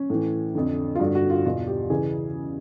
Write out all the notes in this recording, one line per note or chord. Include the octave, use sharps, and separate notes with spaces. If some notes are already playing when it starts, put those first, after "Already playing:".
Already playing: C#4
A2 E3
F2 D3
F4
G2 D3 F#4
F#4
F4
E2 B2 F4
G4
C#3 E3 G#4